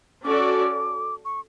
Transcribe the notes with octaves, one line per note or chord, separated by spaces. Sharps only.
C#4 F#4 A4 D5 D6
C#6